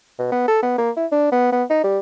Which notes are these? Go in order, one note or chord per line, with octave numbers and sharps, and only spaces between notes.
B2
B3
A4
B3
A#3
E4
D4
B3
B3
D#4
G3